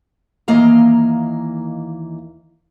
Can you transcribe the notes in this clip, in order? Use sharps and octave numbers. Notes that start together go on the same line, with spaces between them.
D#2 E3 A#3 D#5 F5 A#5